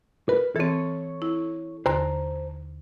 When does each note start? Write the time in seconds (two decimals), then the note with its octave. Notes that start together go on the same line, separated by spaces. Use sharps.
0.29 A#4 B4
0.56 E3 C4 A4 C#5
1.22 E4
1.86 D#2 D3 C5 A5 A#5